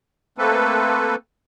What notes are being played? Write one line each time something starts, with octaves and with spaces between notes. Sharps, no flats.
A3 A#3 C4 A4 B4